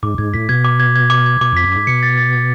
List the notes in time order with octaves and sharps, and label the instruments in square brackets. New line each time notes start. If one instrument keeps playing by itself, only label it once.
[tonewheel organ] G#2 [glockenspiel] D6
[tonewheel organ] G#2 [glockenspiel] G#6
[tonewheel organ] A2 [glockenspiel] B6
[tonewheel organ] B2 [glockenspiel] G#6
[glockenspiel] D6
G#6
G#6
D6
G#6
[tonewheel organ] B2 [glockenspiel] D6
[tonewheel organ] F2 [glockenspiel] B6
[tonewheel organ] F#2
[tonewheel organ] G#2 [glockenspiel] D6
[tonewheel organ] B2 [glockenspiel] C#7
[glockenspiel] A6
A6
A6